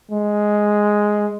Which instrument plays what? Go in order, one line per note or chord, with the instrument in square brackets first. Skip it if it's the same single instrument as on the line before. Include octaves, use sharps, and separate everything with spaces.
[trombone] G#3